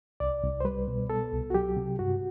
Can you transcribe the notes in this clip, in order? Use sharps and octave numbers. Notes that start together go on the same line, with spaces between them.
C2 D5
C2
C5
G3 B4
B2
B3 A4
C2
F#4
F#3 G4
C3
G2 F#4